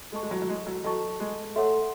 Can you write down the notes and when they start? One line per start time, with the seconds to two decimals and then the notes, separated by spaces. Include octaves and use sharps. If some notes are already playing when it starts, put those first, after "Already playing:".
0.12 G#3 A4 D#5 A5 C#6
0.23 G#3
0.31 F#3
0.42 F#3
0.49 G#3
0.67 F#3
0.84 F#3 A4 D#5 A5 C#6
1.20 G#3
1.56 A3 A4 C#5 F#5 C6